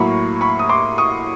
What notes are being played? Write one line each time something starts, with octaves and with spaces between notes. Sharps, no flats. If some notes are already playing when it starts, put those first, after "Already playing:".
Already playing: A2 F#3 A#3 B5 C#6
B5 C#6
D#6
C6 D6
C#6 D#6